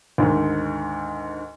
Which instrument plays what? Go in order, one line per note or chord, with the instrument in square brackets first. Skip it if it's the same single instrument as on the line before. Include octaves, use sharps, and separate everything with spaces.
[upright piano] D2 G#2 D#3